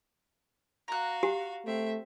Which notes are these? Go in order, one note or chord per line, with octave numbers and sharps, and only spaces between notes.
F#4 F5 A#5 F#6
G4
A3 C4 E5